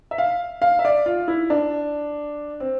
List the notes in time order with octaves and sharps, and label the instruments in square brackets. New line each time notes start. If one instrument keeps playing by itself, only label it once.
[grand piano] E5
F5
F5
E5
D5
F4
E4
D4
C4